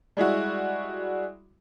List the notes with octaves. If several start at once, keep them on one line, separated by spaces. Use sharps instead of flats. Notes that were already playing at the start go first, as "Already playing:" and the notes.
G3 G#3 E4 F#4